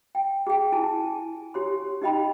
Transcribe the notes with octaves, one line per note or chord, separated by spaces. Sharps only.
G5
G#4 G5
E4 G#4 G#5 A5
G4 C#5 C6
D#4 G4 D#5 G5 B5